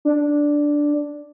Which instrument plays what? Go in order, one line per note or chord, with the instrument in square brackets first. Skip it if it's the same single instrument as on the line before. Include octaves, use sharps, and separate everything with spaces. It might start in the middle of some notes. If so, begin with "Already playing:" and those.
[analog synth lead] D4